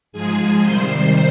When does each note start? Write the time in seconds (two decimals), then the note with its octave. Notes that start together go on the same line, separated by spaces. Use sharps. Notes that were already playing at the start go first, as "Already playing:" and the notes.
0.12 G#2 F3 G#3 G#4 G#5
0.62 C3 D#3 G3 C5 C6